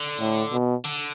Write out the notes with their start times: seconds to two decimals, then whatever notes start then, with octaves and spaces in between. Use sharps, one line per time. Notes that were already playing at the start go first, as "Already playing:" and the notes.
Already playing: D3
0.20 A2
0.52 B2
0.85 D3